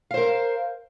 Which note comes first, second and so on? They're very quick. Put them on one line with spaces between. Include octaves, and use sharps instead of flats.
F5 C5 A#4